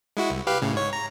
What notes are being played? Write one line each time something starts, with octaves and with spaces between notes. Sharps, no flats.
G#3 E4 F#4
C2
G4 B4 F5
A2 C#3
G#2 C#5
A#5